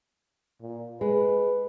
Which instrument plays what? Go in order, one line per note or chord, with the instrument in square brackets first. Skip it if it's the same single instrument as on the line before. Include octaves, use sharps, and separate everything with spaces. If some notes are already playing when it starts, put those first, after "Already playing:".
[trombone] A#2
[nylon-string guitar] G#3 [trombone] B4